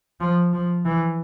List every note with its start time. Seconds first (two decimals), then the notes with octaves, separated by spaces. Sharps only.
0.20 F3
0.53 F3
0.85 E3